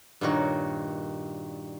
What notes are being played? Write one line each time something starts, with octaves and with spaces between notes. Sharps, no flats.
G2 A#2 D#3 F#4 C#5